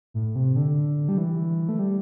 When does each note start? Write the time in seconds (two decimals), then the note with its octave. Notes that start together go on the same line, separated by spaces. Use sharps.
0.14 A2
0.36 C3
0.56 D3
1.09 G3
1.18 E3
1.69 A3
1.79 G3